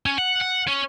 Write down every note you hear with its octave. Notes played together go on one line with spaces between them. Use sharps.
C#4
F#5
F#5
C#4